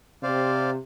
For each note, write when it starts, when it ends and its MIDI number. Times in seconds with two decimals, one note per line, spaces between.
0.23 0.77 48
0.23 0.70 72
0.23 0.70 74
0.23 0.70 77